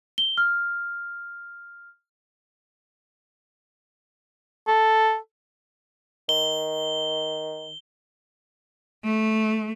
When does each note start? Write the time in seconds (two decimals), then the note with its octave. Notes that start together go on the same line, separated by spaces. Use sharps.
0.18 G7
0.38 F6
4.67 A4
6.29 D#3 G7
9.04 A3